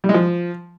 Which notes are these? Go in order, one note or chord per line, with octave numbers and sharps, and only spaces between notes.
G3
G#3
F3